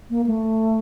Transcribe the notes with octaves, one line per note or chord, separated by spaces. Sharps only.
A#3
A3